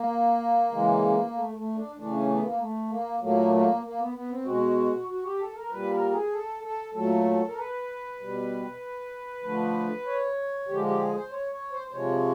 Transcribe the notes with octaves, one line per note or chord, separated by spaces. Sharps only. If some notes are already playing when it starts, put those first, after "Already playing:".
Already playing: A#3
C#3 E3 G#3
A3
A3
D4
C#3 E3 A3 D4
C#4
B3
A#3
A3
A#3
A#2 F#3 A3 A#3
A#3
A#3
B3
B3
C4
B2 G#3 F#4
F#4
G4
A4
A#4
A#2 G3 B4
A#4
G#4
A4
A4
A#2 F#3 A3 A4
A#4
B4
B2 G3
D3 F3 A3
C#5
D3 F3 G#3 G4
G4
G#4
C5
C#5
C#5
C5
C5
C3 F3 G#3 C#5